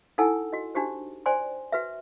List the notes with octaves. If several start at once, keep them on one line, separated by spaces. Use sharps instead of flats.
D#4 E4 A4 F#5 G#5 E6
F#4 D#5
D4 D#4 F#4 G4 C5
C5 D5 G5 G#5 C6
F#4 B4 E5